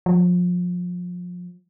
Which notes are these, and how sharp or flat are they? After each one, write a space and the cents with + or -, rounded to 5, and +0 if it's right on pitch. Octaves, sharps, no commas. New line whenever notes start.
F3 +30